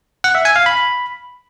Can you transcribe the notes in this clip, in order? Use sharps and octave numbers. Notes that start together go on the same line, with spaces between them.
F#5
E5
G#5
F5
B5